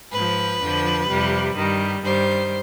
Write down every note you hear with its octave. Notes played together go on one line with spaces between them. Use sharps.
G#2 F3 B4
F2 D3 F3
F2 C3 G3
G2 D#3 G3
G2 D#3 G3 C5